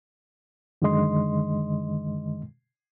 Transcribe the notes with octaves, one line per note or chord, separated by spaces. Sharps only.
F#2 D3 D#3 G#3 D#5 C6